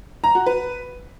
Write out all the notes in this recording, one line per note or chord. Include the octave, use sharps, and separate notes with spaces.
A#5
F#4
B4